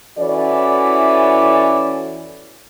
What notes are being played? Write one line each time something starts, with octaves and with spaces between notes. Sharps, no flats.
E3 C#4 E4 F#4 A4 D5